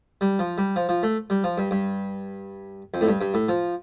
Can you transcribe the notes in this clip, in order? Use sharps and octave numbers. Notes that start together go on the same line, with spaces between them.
G3
F3
G3
F3
F3
A3
G3
F3
G2
G2
F2
A2
G2
G2
A2
F3